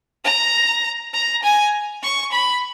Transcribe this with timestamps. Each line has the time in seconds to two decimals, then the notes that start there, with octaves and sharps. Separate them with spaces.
0.25 A#5
1.14 A#5
1.43 G#5
2.03 C#6
2.32 B5